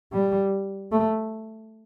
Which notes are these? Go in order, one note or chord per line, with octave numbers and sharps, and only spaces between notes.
G3
A3